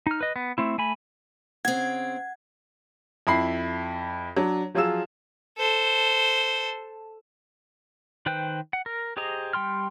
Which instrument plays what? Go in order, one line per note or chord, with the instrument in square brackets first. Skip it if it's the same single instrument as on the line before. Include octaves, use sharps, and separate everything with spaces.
[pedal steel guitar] D#4 F6
B4 D#5
B3
A3 C4 E4
A3 G#5 B5
[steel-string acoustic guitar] C#3 C4 [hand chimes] F#5 [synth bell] G#6
[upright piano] F2 E4 B5 C7
F#3 D4
F3 F#3 F4 G#4 E6 E7
[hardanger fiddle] A4 C5
[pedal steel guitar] D#3 B4 C5 G5 F#6
F#5
A#4
G4 G#4 C5 D#5 A#5
G3 G5 C6 F6